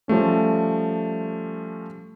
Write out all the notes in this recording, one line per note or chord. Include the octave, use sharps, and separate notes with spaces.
F3 G3 A3 C#4